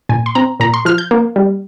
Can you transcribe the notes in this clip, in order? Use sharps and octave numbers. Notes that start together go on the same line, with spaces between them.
A#2 G#5
C6
C4 A#5
A#2 A#5
C6
F3 F6
G6
A#3
G3